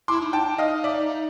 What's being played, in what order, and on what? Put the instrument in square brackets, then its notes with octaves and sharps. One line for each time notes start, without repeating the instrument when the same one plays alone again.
[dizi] E4 [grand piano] C6 D6
[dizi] D#4
[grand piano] G5 A5
[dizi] D#4
[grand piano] D#5 F5
D5 E5